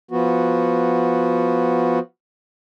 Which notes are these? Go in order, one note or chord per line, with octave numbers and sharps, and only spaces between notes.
F3 B3 F#4